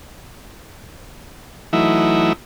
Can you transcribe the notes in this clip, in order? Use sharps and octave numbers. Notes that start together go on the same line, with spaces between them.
E3 F#3 A3 D#4 E4